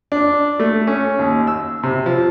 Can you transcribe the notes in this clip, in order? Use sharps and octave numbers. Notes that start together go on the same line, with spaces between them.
D4
A3
C#4
D#2
E6
C3
F3